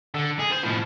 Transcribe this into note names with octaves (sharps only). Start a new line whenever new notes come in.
D3
G#4
C5
A2 F3